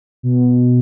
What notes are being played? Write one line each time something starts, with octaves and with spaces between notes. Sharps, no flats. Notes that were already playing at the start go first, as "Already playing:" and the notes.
B2